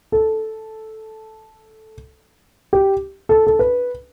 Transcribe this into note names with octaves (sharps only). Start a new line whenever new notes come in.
A4
G4
A4
A4
B4